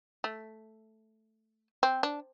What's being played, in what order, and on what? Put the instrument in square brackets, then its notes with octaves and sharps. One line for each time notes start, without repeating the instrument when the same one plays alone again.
[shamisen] A3
C4
D4